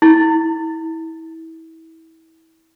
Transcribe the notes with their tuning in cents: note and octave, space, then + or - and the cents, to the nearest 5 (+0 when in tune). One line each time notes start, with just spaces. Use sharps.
E4 -30